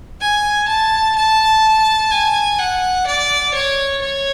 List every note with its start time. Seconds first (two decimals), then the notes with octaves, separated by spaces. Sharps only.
0.21 G#5
0.68 A5
1.16 A5
2.11 G#5
2.58 F#5
3.07 D5
3.54 C#5
4.01 C#5